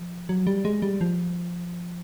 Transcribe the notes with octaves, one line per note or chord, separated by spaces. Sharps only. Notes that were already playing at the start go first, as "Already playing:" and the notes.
Already playing: F3
F#3
G3
G#3
G3
F3